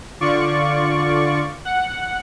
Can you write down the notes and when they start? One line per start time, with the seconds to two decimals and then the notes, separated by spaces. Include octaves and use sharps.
0.21 D3 F4 D5 C#6
1.65 F#5